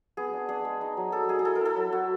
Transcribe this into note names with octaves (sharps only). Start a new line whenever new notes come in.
B3 G#4
D4
D4 G#4
G#3
D#4
F#3
F#3 A4
D#4 G#4
G#4
E4 A4
A#4
E4 A4
F#3
E4 F#4